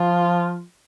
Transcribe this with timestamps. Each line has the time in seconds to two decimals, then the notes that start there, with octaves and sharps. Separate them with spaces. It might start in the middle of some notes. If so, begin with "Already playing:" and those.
Already playing: F3 F4